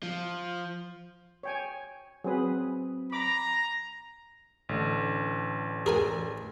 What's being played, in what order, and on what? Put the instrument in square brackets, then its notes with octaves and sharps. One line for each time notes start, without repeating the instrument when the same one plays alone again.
[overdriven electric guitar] F3
[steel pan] C#5 G5 G#5
[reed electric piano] F#3 C4 D#6 [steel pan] G#4 B4
[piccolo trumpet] A#5 [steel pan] B5 D6
[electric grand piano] A1 D3
[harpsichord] G#4 A#4 G#5